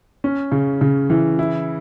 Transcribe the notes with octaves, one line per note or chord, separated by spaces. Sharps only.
C#4
C#3
C#3
E3
E4